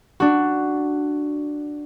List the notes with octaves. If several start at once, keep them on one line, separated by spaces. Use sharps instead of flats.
D4 F#4